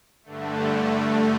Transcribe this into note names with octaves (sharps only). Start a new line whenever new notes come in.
G2 D3 A3